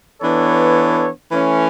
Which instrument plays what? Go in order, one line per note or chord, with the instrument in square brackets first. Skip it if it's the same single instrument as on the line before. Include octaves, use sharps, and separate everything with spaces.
[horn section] E3 B3 D4 A4 C#5
E3 A3 C#4